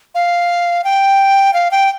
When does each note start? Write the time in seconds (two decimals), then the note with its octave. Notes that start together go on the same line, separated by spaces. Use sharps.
0.15 F5
0.84 G5
1.54 F5
1.71 G5